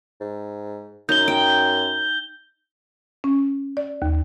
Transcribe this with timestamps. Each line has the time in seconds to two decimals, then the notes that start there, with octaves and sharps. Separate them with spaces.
0.21 G#2
1.09 F#2 D#4 G6 G7
1.28 G5
3.24 C#4
3.77 D5
4.02 D#2